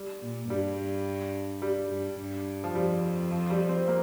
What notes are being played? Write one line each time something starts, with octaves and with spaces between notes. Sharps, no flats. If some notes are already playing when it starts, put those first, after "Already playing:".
Already playing: G3
A#2
G2 G3
G3
G2
G2
F3
F2 G3
F3
G3
C4
A#3